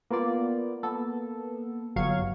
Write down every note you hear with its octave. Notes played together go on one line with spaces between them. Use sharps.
A#3 B3 F4 D5
A#3 B3 A4
G1 F#3 F5 C#6 G#6